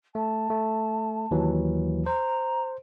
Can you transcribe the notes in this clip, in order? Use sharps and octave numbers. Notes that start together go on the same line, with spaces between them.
A3 A5
A3
D#2 E3 F#3
C5 A#5